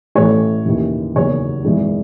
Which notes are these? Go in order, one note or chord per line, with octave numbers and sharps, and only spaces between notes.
A1 A2 E3 A3 C#5
D#2 C#3 E3
F#1 E2 D#3 F#3 C#5
G#1 F#2 E3 G#3